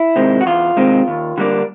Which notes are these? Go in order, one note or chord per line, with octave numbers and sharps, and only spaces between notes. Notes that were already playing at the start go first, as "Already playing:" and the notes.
Already playing: E4
C3 D#3 G#3 C4
F#4
E2 F4
C3 D#3 G#3 C4
D#2
D3 G3 A#3 D4